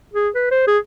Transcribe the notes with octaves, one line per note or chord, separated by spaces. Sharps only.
G#4
B4
C5
G#4